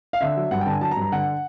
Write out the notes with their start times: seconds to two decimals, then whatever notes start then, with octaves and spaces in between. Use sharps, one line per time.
0.13 F5
0.21 D3 E5
0.37 F#3
0.51 G2 F#5
0.61 G5
0.66 D3 A5
0.71 G#5
0.81 F#3 A5
0.91 A#5
0.97 G2
1.02 A#5
1.12 D3 F#5